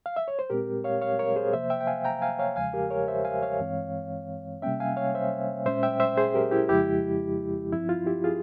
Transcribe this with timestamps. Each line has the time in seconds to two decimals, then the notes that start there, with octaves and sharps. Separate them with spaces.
0.06 F5
0.17 E5
0.28 C#5
0.39 C5
0.50 A#2 G#3 C4 G4 A#4
0.84 C#5 F5
1.01 C#5 F5
1.19 A#4 C#5
1.36 G#4 C5
1.53 C3 F3 A#3 C5 E5
1.70 E5 G5
1.81 G5
1.87 F5 G#5
2.04 G5 A#5
2.22 F5 G#5
2.39 C#5 F5
2.56 E2 C#3 F3 G#3 F5 G#5
2.73 G4 A#4
2.90 A#4 C#5
3.08 C5 E5
3.25 F5 G#5
3.42 C#5 F5
3.60 G2 E3 G#3 C4
4.62 C3 G3 A#3 C#4 E5 G5
4.80 F5 G#5
4.97 C#5 F5
5.14 C5 E5
5.65 A#2 G#3 C#4 C5 E5
5.83 E5 G5
6.00 C5 E5
6.17 G#4 C5
6.34 G4 A#4
6.51 E4 G4
6.69 F2 C#3 F3 G#3 E4 G4
7.72 G2 F3 C4 E4
7.89 F4
8.06 E4 G4
8.24 F4 G#4